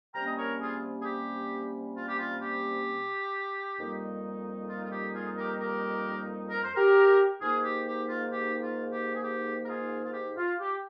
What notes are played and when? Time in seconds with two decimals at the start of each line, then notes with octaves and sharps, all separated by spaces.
0.15 C3 G3 A#3 C#4 G5 A#5
0.27 D#5
0.38 A#4 C#5
0.61 F4 G#4
1.02 G#4
1.05 G4
1.97 F4
2.09 G4
2.19 F4
2.42 G4
3.78 F2 D#3 G3 A#3 D#4
4.69 F4
4.84 F4
4.91 G4
5.14 F4 G#4
5.37 G4 A#4
5.60 G4 A#4
6.51 A#4
6.64 C5
6.76 G4 A#4
7.41 G#2 D#3 A#3 D#4 F4 G#4
7.64 G4
7.87 G4
8.09 F4
8.33 G4
8.63 F4
8.92 G4
9.15 G#4
9.23 G4
9.65 A#4
9.68 F4 G#4
10.05 F4
10.14 G4
10.37 F4
10.60 G4